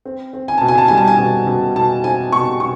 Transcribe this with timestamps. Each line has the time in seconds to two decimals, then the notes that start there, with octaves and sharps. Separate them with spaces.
0.05 C4
0.33 C4
0.48 G#5
0.58 B2 A5
0.68 G#5
0.78 A5
0.88 G3 G#5
0.98 A5
1.08 G#5
1.18 B2
1.47 B2
1.76 B2 A5
2.04 C4 G#5
2.32 B2 C#6
2.60 B2 C#6